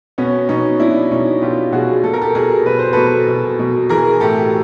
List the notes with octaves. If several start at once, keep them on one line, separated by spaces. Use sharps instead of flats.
B2 B3 C#4
B2 C#4 D#4
B2 D4 E4
B2 C#4 D#4
B2 F4 G4
B2 F#4 G#4
B2 A4
A#4
G4 A4
B2 G#4 A#4
B2 B4
C5
B2 A4 B4
B2
B2
E3 G#4 A#4
A2 G4 A4